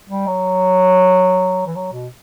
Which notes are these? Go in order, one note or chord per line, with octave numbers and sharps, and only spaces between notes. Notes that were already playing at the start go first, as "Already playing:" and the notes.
G3
F#3
E3
F#3
B2